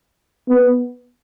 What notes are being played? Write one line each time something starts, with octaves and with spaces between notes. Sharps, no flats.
B3